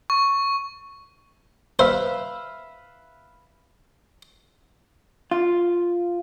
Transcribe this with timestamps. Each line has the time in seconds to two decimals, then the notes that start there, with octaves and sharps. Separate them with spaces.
0.10 C#6
1.79 B4 C5 E5 F5
5.31 F4